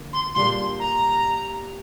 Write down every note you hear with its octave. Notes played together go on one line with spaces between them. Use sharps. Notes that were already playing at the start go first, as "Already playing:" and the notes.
Already playing: D3 F3 A#3
C6
A#2 G3 D4 G4 C6
A#5